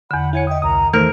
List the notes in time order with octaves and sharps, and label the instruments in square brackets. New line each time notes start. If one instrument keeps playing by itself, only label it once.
[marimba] E2 D3 [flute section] F#5 B5
[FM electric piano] E4 G#6 C#7 [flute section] C#5 F#5 G#5
[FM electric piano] D#5 D#6 [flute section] E5 G5
[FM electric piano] C2 D#6 [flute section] A#4 A#5
[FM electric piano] D#3 A3 C5 [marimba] E3 [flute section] A4 [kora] A#4